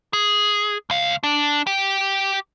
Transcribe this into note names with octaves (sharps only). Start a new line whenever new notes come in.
G#4
C#2 F5
D4
G4 G5